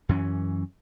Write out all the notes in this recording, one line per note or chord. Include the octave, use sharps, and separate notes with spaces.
F#2 E3 C#4